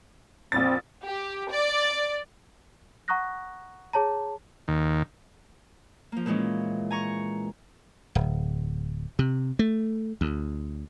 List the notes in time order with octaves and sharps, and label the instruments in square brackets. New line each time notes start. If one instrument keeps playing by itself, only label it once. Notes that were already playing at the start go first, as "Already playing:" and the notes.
[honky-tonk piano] A#1 F2 A6 [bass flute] C4
[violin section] G4
D5
[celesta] F#5 A#5 C#6 D#6 F#6 A#6
G#4 C#5 A5 A#5
[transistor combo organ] D#2
[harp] F3 A#3
A#2 E3 G#3 C#4
G#5 A#5 C#6
[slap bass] D1
C3
A3
D2